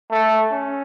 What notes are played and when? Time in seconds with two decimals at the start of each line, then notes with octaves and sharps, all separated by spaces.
0.11 A3
0.52 C#4